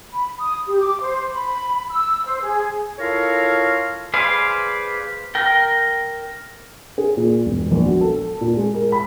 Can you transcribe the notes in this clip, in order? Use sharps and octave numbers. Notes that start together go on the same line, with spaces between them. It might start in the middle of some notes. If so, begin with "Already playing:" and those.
B5
D#6
G4
D6
C5
B5
E6
C5
G#4
E4 F4 A4 A#4 C#5 F5
G#4 B4 C5 D5 F5
A#4 G5
G#4
A#2
E1
A#1
F#4
A4
A#2
G#3
A#4
B5